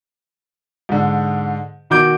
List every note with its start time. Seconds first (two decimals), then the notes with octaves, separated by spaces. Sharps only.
0.89 G#2 D3
1.90 B2 D#3 F#4 D6 G6 D7